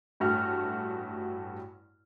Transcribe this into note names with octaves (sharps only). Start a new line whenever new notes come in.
A1 G2 A3 F#4 F6